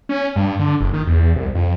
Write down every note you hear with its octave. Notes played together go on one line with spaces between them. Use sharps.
C#4
G2
D3
F#1
D#3
E2
C2
F2